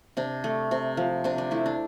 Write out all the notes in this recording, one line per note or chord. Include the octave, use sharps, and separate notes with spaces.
C3 D4
A3
C3
F3
C3 D4
D4
A3 E4
D4